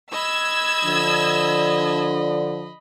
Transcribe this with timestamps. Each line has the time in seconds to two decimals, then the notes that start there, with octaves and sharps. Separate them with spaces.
0.12 D#5 B5 E6 G#6
0.84 D3 F3 D4